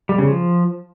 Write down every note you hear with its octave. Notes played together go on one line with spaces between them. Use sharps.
G3
C#3
F3